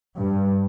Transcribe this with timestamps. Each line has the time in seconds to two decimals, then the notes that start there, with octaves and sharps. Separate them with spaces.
0.18 G2